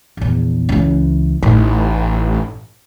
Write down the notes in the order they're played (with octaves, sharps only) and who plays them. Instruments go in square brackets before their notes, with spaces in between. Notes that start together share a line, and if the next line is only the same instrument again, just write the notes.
[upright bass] A#1 E2
C#2 E3
[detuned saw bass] A1 [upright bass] A2 D#4